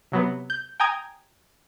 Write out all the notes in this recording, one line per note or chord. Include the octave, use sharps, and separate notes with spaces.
C3 F#3 B3
G6
G5 G#5 A#5 D#6 G#6